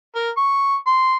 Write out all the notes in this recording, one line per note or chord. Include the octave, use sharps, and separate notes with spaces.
A#4
C#6
C6